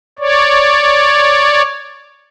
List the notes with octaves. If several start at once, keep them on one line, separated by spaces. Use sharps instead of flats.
C#5 D5